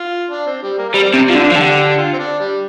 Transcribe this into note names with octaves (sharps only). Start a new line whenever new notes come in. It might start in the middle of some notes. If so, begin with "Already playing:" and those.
Already playing: F4
D4
C4
G3
A#3
A#3
G3 C4
C3 G3
F3
D3 D4
F3
D3 G4
G4
G4
F4
C4
D4
G3